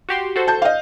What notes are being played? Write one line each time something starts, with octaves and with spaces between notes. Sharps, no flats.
F#4 G4 C6
F#4 A4 C5
A5 G6
D#5 F5